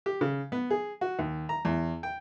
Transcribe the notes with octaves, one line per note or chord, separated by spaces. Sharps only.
G4
C#3
B3
G#4
F#4
D#2
A#5
E2
G5